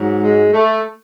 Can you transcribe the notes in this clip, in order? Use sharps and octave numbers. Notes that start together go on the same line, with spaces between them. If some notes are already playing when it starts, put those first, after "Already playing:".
Already playing: G#2 F#3
G#3
A3